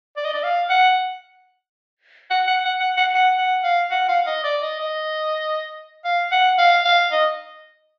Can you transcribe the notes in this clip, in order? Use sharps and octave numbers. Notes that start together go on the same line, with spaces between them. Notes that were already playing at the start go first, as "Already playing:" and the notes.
D5
D#5
D5
F5
F#5
F#5
F#5
F#5
F#5
F#5
F#5
F#5
F5
F#5
F5
D#5
D5
D#5
D#5
F5
F#5
F5
F5
D#5